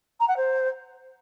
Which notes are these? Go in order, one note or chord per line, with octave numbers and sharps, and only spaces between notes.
A#5
F#5
C5